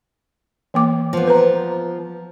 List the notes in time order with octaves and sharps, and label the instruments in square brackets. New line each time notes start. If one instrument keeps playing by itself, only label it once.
[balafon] E3 A#3 D6
[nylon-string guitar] F3 B3
[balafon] B4 C5 A#5